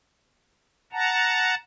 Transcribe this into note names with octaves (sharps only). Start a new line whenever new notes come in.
F#5 A5 A#5